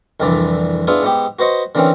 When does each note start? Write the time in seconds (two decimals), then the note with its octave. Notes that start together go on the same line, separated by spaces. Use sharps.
0.20 C2 F2 D3 E3 D5 B5
0.87 B3 D4 E4 F4 G#4 B4
1.02 G#2 B3 G4
1.39 F#4 B4 C5 D#5 C#6
1.75 D3 E3 A#3 C4 C#4